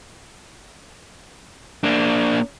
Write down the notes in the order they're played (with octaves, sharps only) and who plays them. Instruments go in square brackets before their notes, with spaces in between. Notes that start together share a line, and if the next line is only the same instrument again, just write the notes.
[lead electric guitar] A#3 D4